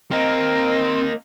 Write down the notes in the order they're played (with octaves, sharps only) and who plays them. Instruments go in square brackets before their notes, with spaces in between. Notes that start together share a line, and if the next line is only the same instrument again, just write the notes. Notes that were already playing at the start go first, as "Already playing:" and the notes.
[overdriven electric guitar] A#3 D#4 [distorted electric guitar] C4 [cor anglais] A#4 [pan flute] D#5